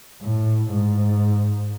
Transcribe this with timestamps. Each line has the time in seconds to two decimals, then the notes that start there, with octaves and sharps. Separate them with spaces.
0.22 A2
0.71 G#2